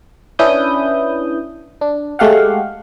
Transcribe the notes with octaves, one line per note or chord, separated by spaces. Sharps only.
C#4 D4 E4 B4 D#6 G6
D4
G#3 A3 G4 F5 F#5